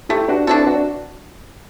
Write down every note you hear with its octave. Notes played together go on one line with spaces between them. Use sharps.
A3 E4 G4
D4 F#4
C4 D4 E4 F#4 A4
D4 F#4